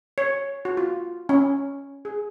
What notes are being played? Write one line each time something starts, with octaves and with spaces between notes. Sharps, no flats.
C#5
F#4
F4
C#4
G#4